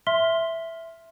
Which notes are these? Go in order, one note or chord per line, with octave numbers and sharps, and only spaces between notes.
E5 C6 F6 B6 G7